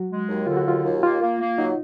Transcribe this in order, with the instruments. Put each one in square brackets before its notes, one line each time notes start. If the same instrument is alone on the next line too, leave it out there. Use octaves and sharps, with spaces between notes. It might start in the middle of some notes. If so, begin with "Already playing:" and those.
Already playing: [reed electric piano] F#3 F#4
[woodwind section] G#3
D#2
[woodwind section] D3 [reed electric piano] F4
[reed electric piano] F#4
[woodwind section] D#2 [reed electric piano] F4
[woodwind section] D#2
[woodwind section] A#3 [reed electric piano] F4
[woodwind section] A#3
A#3
[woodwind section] F#3 [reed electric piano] D#4